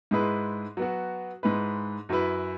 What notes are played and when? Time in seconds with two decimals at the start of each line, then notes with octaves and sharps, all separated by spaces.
0.11 G#2 G#3 E4 G#4 B4
0.77 F#3 B3 F#4
1.43 G#2 G#3 E4 B4
2.09 F#2 F#3 E4 B4